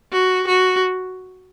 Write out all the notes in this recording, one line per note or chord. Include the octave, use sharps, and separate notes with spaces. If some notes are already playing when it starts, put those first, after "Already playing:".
F#4
F#4